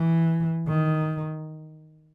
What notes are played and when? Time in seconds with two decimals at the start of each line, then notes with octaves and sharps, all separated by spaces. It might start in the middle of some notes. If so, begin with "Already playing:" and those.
Already playing: E3
0.68 D#3